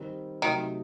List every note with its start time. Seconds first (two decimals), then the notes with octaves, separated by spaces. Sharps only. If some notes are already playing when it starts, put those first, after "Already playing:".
Already playing: D#3 G3 C4
0.42 C3 D#3 F#3 A3 D#4